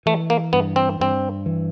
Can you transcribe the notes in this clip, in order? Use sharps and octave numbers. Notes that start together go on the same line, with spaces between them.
E3 A3
A#3
G2 B3
C4
G2 C4
E3